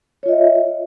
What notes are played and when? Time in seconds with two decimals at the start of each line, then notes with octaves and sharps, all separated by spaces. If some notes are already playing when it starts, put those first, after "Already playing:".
0.23 C#5
0.26 F4
0.28 D#5
0.31 E5